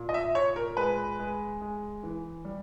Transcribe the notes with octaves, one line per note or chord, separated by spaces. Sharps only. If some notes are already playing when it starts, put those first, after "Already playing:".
Already playing: A#2
D#5
E5
A#2 C#5
A#4
G#3 B4
G#3
G#3
E3
G3